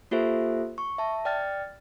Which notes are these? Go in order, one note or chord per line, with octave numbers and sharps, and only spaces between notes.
A#3 F4 G4 A4 C5 E5
C#6
E5 A5
D5 G5 F6 A6